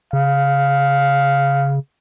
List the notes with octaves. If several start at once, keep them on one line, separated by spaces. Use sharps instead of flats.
C#3 F5